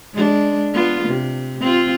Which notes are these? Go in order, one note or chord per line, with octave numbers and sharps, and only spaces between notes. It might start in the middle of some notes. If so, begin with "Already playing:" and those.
G#3 D4
B3 F4
C3
C4 F4